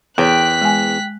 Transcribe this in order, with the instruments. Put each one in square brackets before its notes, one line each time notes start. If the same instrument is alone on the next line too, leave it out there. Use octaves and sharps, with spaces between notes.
[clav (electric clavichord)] E2 [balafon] C#5 [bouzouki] G5 [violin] F#6 B6
[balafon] G#3 G#5